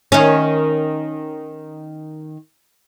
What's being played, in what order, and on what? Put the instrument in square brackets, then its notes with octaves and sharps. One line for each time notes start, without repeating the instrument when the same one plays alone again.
[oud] D#3 C#4